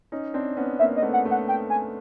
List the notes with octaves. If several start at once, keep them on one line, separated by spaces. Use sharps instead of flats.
C#4 D#4
C4 D4
B3 C#4
A#3 C4 E5
D#5
A3 B3
F#5
A3
F#5
G5
G#5